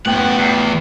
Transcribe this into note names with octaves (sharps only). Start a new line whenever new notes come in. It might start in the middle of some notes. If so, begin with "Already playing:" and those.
F#2 A2 B3 F#5 G5
E2